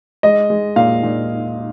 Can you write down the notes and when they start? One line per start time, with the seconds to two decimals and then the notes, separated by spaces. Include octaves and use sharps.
0.23 G#3 D#5
0.50 G#3
0.76 A#2 F5
1.03 A#2